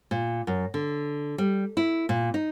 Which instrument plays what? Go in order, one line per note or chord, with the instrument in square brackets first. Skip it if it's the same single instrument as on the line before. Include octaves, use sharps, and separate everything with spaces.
[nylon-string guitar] A#2
F#2
D3
G3
E4
A#2
D#4